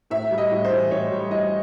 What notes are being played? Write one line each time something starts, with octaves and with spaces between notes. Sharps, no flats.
A2 E5
G3
D#5
A2
C5
E3
A2 C#5
G3
A2 D#5